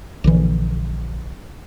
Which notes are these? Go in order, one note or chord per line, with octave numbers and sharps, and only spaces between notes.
A#1 D3 E3